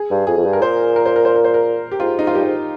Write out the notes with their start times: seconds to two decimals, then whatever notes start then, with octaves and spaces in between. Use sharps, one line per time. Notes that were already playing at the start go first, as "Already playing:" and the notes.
Already playing: G#4
0.10 G2
0.27 F2 G#4
0.37 F2
0.44 G2
0.53 A#4
0.62 A#2 C5
0.96 A#4
1.06 C5
1.16 A#4
1.25 C5
1.36 A#4
1.44 C5
1.54 A#4
1.91 G4
2.00 G#2 F4
2.19 D#4
2.27 F4
2.35 G2 G4
2.44 G#2